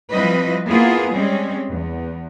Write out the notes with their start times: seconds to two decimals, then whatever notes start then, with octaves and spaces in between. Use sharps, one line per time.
0.10 F3 G3 C4 E4 B4 D#5
0.68 A#3 B3 E4 F4 G#4
1.14 G3 G#3 C4 C#4
1.69 E2